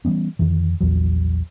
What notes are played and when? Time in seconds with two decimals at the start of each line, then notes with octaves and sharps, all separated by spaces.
0.05 E3 G3 B3 C#4
0.39 F2 D#3 E3
0.81 A#1 E2 E3 F#3